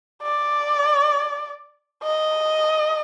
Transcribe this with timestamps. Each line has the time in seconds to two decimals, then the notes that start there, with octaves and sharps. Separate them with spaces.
0.23 D5
2.03 D#5